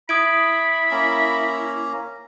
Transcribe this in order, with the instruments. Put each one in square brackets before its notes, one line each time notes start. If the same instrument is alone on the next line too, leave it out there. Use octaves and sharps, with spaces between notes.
[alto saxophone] E4 [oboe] B5 [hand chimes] D#6 G#6 D7
[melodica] A#3 C#4 A#5